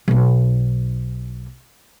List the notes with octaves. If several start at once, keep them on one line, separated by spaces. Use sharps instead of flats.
B1 D#4